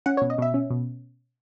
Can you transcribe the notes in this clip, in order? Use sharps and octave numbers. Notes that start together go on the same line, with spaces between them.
C#4 F#5
C#5
B2
D#5
B2 E5
C#4
B2